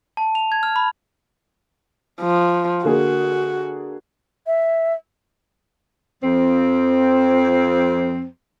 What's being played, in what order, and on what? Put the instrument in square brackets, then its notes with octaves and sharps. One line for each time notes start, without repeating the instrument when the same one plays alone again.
[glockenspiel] A5
F7
G#6
F6
B5
[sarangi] F3
[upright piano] D3 A#3 G#4 [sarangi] F#4
[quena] E5
[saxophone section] F2 F3 C4